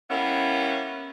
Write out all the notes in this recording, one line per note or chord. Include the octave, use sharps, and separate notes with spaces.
G3 A#3 B3 C#4 E4